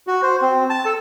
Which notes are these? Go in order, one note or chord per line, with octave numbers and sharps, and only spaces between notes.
F#4
C5
C4
A5
A4